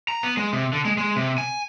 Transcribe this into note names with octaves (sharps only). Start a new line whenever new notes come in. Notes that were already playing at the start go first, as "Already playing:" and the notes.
A#5
B3
G#3
C3
D3
G#3
G#3
C3
G#5